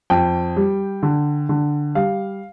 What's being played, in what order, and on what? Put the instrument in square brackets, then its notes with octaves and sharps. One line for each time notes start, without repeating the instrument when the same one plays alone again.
[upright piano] F2 G5
G3
D3
D3
G3 F5